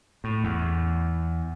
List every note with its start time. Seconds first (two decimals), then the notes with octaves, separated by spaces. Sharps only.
0.24 A2
0.44 E2